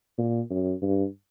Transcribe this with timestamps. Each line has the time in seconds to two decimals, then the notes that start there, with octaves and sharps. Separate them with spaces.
0.18 A#2
0.50 F#2
0.82 G2